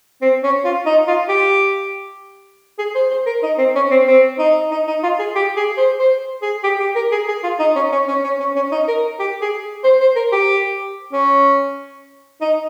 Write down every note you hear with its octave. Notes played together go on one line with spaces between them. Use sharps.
C4
C#4
F4
D#4
F4
G4
G#4
C5
C5
A#4
D#4
C4
C#4
C4
C4
D#4
D#4
D#4
F4
G#4
G4
G#4
C5
C5
G#4
G4
G4
A#4
G#4
G#4
F4
D#4
C#4
C#4
C#4
C#4
C#4
C#4
D#4
A#4
G4
G#4
C5
C5
A#4
G4
C#4
D#4